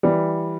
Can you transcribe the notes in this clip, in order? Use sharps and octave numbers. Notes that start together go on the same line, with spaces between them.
E3 G3